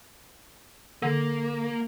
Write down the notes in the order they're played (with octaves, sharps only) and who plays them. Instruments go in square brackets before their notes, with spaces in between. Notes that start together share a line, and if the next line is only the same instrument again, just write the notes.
[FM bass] D3 [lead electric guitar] A#3